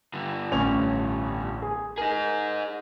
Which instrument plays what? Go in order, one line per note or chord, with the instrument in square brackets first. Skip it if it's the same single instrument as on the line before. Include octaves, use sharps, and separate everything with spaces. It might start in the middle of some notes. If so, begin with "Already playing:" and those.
[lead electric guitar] G2 D3
[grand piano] A1 C#4 F7
G#4
[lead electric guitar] D#4 G#4 [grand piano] A#4